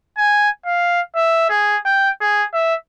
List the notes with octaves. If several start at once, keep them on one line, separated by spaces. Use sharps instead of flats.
G#5
F5
E5
G#4
G5
G#4
E5